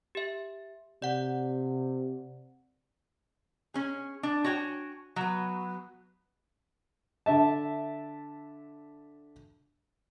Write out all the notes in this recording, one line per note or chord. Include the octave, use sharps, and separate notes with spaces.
G4 E5
C3 D5 F#5
C#4 G#4
D4
F#4 C#5 G5 G#5
F#3 B3
D3 E5 A5